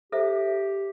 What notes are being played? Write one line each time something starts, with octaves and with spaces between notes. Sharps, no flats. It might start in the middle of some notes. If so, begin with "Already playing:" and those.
G4 A4 C5 E5